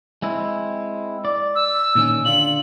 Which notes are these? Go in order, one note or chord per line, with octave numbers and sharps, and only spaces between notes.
G#3 C4 E4
D5
E6
A#2 D#3 C#4
D3 F4 F#7